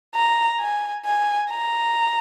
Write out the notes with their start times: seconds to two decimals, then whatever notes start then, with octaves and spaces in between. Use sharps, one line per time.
0.15 A#5
0.60 G#5
1.06 G#5
1.50 A#5